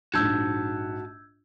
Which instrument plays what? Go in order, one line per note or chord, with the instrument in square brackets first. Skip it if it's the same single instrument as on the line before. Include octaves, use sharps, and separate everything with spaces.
[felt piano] A#1 G#2 [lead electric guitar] F#4 A5 [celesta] E6 G6 G#6